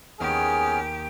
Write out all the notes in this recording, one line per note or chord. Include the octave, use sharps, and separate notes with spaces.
D#2 B3 C#4 G4 G#4 F6